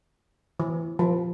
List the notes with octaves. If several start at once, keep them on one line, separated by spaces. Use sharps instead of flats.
E3
F3